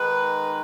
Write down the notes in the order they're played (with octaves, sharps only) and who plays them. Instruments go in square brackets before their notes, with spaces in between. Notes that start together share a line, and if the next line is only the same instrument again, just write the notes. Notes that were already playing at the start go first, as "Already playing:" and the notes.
Already playing: [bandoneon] D#3 G#3 D#4 [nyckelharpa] B4